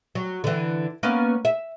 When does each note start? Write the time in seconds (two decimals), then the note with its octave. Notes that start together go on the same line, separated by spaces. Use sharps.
0.15 F#3
0.44 D3 E3
1.03 A#3 B3 C#4
1.45 E5